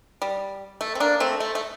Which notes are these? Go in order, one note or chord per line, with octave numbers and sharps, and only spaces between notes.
G3
A3
C4
A#3 D4
A3 C4
A3
A3